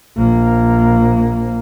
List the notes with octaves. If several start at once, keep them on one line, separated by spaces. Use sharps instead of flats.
A#1 A#3